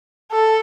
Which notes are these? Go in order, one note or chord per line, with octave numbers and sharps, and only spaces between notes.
A4